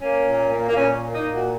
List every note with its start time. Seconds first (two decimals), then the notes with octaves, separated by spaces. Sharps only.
0.02 A#3 C#4
0.27 A#2
0.52 A#3
0.69 A#3
0.76 A#2 C#4
1.01 A#3
1.15 D#4
1.27 A#2
1.34 F#4